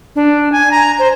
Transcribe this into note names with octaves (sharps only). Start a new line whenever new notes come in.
D4
G#5
A#5
C5